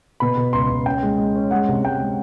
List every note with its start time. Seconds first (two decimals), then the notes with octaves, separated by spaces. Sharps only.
0.20 B2 B5
0.37 B2
0.53 C#2 C6
0.70 C#2
0.86 C#4 G5
1.03 G#3
1.18 G#3
1.36 C#4
1.51 G#3 F#5
1.68 C3
1.83 G#3 G5
2.00 G#3